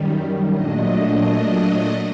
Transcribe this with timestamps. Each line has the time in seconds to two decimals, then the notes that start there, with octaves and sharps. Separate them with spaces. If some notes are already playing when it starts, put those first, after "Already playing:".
Already playing: F#2 D#3 G3
0.50 A#2 F#3 A3 D4 D#5